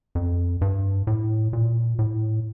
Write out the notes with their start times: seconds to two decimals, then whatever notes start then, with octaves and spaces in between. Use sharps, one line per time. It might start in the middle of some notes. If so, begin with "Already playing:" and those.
0.15 F2
0.61 G2
1.07 A2
1.53 A#2
1.99 A2